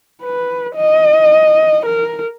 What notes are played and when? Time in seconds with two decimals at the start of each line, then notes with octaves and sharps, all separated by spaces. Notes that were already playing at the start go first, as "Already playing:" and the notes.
0.23 B4
0.76 D#5
1.86 A#4